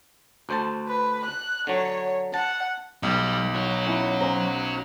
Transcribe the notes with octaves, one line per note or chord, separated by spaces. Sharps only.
D2 C5 A5
B4
F#6
D3 F#3 C#5
F#5 A5
B1 G3
F#4 C#5
C#4 E4
C#4 C5 A#5